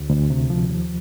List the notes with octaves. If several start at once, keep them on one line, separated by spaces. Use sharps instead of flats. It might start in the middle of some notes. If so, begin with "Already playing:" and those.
Already playing: D2
D2
C3
F3
D#2